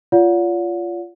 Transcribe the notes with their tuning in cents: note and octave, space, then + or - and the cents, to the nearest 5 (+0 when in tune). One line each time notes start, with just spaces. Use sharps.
F4 -15 D5 -45 F#5 -35